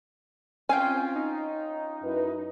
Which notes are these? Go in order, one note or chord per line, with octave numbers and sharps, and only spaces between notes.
C4 C#4 F4 G5 G#5
D#4
F#2 E4 B4